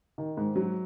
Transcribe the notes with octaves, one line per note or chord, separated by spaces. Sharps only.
D#3
G#2
F#3